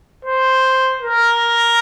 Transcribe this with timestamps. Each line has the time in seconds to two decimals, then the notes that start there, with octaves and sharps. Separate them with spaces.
0.25 C5
1.02 A#4